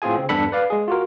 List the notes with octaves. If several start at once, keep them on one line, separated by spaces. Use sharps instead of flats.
A2 C4 F4 G#4 G#5
C#3 C4
E2 G2 D4 A4 B5 C#7
B4 D5 F5
G#3 G#4
F4 F#4 A#4